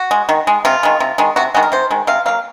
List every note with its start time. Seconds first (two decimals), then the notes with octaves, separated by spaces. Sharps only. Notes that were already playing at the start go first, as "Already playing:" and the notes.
Already playing: F#4
0.11 G#3
0.29 D#3
0.47 G#3
0.65 C3 F4
0.83 D#3 G#3
1.00 C3
1.18 D#3 G#3
1.36 C3 F#4
1.54 D#3 G#3 F#4
1.63 A#4
1.72 C3 C5
1.91 D#3 G#3
2.07 C3 F5
2.26 F#3 A#3 F5